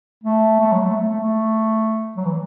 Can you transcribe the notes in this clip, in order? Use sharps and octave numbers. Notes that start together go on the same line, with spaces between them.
A3
A3
F#3
A3
A3
A3
A3
F#3
E3